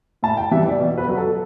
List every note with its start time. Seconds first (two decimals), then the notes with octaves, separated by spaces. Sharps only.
0.23 A2 A5
0.37 G5
0.51 E3 G3 E5
0.66 D5
0.79 B2
0.98 B4
1.08 F#3
1.17 A4